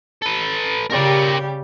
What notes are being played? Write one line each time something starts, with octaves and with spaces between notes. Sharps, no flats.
A4 B4
C#3 G3 G4 A#4 D5